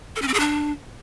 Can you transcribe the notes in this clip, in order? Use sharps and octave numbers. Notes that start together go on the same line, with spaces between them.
A4
C#4
C4
G#4
D4